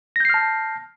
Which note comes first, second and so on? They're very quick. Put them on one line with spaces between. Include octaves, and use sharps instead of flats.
A#6 G6 C7 F6 A5